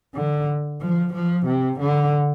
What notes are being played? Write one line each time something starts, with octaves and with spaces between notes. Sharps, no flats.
D3
F3
F3
C3
D3